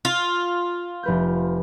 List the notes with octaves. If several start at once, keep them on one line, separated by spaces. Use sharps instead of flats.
F4
F1 B4 G6